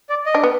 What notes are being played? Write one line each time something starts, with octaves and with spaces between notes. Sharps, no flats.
D5
D#5
D4
B3